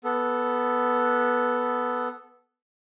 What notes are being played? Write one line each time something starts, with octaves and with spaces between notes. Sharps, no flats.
B3 A4